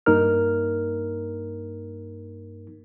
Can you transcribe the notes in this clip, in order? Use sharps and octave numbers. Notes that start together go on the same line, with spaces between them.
G2 A#3 D#4 A#4 F6